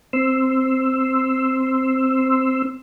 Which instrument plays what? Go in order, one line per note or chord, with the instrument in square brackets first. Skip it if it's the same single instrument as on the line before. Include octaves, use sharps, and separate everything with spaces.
[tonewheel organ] C4 C6 E6